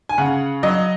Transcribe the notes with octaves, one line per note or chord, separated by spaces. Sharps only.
G#5
C#3 F#5
F#3 D#5